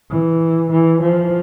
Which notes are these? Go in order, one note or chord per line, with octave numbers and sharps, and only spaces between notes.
E3
E3
F3